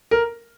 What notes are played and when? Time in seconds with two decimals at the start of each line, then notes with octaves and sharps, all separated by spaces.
0.11 A#4